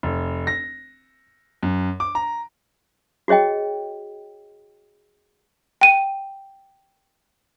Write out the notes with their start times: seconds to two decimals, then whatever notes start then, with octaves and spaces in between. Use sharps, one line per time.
0.03 F1
0.47 A#6
1.63 F#2
2.00 D6
2.15 A#5
3.28 F#4 G#4 C#5 D#5 G5
5.81 G5 D#7